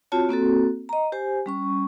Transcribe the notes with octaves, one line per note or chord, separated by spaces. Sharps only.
C4 F4 F#4 C#5 A5
A#3 C4 F#4 A4
D#5 A#5
G4 C5 G#5
G3 C#4 C#6